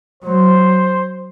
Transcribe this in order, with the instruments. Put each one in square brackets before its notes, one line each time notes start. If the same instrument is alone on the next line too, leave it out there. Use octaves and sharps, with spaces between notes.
[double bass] F#3 [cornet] C5